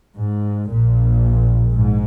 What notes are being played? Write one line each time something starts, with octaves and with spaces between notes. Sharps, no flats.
G#2
A#1 A#2
G#2